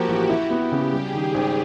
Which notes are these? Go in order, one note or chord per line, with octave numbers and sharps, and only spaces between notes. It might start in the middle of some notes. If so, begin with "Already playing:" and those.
Already playing: F3 A#3 F#4 G4
A1
E4 F#4
B3
G4
C#3
G3 G#4
D#3
G#1